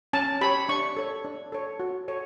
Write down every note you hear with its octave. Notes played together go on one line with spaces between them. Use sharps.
C#4 A5
G4 C#5 B5
D4 C#6
A4 C#5
D4
A4 C#5
F#4
A4 C#5